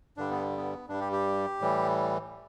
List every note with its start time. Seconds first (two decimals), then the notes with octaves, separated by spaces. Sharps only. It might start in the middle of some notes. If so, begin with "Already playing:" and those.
0.17 G2 D3 G3 D4
0.31 B3
0.57 B3
0.89 G2 G3 D4
1.01 G4
1.13 G4
1.61 A2 E3 G3